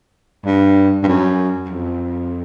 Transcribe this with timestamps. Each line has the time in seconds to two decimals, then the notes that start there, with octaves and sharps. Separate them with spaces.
0.46 G2
1.03 G2
1.08 F#2
1.69 F2